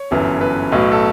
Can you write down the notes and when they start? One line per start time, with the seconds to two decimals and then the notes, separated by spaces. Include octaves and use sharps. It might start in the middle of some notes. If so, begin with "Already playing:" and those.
Already playing: C#5
0.11 G1 F#2 E3
0.41 B4
0.72 B1 A2 F#3
0.92 A4